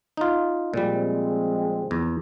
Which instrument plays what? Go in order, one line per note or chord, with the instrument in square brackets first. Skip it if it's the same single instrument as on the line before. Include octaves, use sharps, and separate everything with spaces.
[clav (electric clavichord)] D#4 F4
[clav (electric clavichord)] A#2 G3 [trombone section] F3 G#3 C4
[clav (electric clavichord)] E2